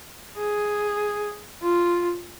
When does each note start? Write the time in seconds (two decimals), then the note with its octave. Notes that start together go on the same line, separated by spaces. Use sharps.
0.38 G#4
1.61 F4